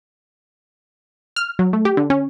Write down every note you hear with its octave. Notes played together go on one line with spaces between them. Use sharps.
F6
F#3
A3
G4
D3
C#4